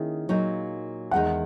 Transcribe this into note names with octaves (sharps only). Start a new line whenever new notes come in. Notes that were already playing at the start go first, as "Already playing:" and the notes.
Already playing: D#3 A#3 C#4 E4 G#4
A#2 F#3 A#3 D#4
E2 D#3 G#3 D#4 F#5